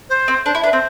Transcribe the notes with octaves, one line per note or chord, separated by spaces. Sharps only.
C5
C4
D4 C5
E4
D4 B4
C4 C5